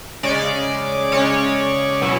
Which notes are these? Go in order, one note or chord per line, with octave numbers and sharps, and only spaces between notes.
C#3 G#3 C#4 D5
C#3 G#3 C#4 C#5
B2 F#3 C#4 E4